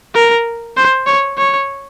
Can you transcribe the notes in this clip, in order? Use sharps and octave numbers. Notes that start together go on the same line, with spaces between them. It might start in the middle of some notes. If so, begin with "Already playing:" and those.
A#4
C5
C#5
C#5